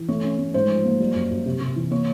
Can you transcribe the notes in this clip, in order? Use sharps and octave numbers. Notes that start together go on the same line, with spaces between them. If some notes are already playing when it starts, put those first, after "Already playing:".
Already playing: E3
A3 C#5
C#4
A3
G#2 C5
F3
A#3
G3
F#2
F#2
C3
C3
E3
A#3 C#5